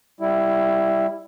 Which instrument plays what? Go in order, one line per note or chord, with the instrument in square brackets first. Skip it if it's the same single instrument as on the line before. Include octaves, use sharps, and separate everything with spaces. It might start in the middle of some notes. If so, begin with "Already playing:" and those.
[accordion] G3 E4